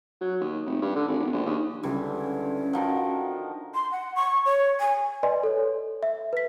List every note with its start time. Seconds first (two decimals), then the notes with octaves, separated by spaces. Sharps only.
0.21 F#3
0.41 D#2
0.66 F1
0.82 G2
0.96 D3
1.08 G#1
1.20 E1
1.33 A#1
1.46 D#2
1.83 C#2 D3 E3 G3 C#4
2.73 D3 D#3 F3 F#4 F#5
3.75 C6
3.92 F#5
4.16 C#6
4.46 C#5
4.80 G#5
5.23 B4 D5 D#5 G#5 C6
5.43 A4 C#5
6.03 E5
6.33 B4 B6